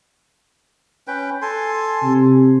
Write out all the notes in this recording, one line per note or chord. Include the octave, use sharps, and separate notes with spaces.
C#4 B4 G5
A4 G#5 C6
C3